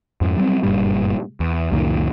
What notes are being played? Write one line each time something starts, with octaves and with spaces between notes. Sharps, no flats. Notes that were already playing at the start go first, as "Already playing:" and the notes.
F2 G#2
F#3 G3 A3 C4
F#1 G2 A#2 G3
E2
C#2 F#2 A#2 D#3